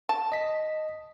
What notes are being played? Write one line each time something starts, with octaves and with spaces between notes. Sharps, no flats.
A5
D#5 B6